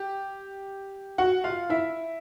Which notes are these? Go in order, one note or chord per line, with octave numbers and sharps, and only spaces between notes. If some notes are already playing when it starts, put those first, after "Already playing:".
Already playing: G4
F#4 F#5
F4 F5
E4 E5